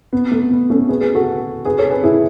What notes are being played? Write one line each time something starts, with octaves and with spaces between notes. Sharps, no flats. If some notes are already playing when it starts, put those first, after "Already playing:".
B3
A3
B3
A3 C#4
G#4 B4
G#4 B4
F#4 A4
G#4 B4
A4 C#5
G#4 B4
E4 G#4